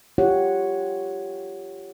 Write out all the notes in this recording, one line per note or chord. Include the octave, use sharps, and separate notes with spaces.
F4 G4 C#5 F#5